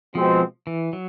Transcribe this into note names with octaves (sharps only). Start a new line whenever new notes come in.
B2 F3 G#3 C4
E3
F#3